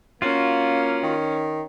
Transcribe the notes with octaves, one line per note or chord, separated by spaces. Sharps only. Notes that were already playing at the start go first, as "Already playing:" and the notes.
A#3 C#4 F4 F#4
D#3